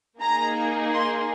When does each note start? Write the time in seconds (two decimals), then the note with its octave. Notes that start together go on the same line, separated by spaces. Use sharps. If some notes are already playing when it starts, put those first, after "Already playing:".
0.21 A#3 D#4 G#4 A#5
0.93 C6